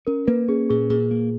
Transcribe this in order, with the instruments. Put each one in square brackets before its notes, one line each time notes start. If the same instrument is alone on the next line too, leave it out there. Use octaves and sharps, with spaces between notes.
[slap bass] C#4 [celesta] A#4
[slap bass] A#3 [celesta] B4
[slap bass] C#4 [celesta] G#4
[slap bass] A#2 [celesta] G#4
[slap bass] A#2 [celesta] G#4
[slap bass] A#3